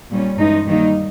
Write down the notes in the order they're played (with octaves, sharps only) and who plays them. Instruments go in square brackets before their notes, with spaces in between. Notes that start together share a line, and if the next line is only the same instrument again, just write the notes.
[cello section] A#2 G3 C#4
G2 E3 G#3 D#4
D#3 G3 A#3 D#4